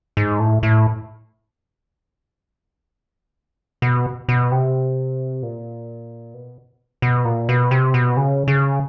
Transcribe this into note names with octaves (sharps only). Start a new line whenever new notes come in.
G#2
A2
A2
B2
B2
C3
A#2
B2
B2
A#2
B2
C3
B2
C#3
C#3